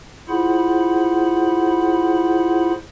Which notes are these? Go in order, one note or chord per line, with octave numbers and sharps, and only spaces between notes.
E4 F4 G#4 C5 F#5 B5